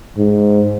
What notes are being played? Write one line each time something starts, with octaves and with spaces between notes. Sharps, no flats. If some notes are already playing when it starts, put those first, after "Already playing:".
G#2